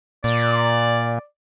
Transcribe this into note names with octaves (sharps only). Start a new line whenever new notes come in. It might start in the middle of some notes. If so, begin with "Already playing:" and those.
A#2 D5